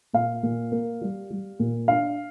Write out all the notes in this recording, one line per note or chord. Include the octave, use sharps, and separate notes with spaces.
A#2 F5
A#2
A#3
G3
G3
A#2
D4 F5